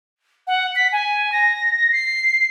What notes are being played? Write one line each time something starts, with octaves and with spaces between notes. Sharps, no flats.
F#5
B6
G#5
A#6
C7